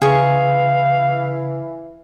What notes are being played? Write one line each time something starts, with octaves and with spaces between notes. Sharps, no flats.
C#3 E3 G#4 F5 C#6